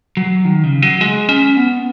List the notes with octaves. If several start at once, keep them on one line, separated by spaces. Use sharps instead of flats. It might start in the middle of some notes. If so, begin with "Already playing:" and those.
F#3
D#3
C#3
F#3
G#3
C#4
B3